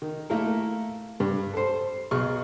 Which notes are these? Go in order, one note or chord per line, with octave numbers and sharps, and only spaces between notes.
D#3
A3 A#3 E4 A4 A#4
G2
A4 C5
B1 G#4 C#6 F6